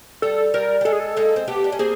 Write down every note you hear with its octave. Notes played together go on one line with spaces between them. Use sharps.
G3 A4
G3 A#4
G3
G#3 A4
G#4
A4
G#3 A#3
C4
A3 B3 G4
D4
C#4
A#3 C4 G#4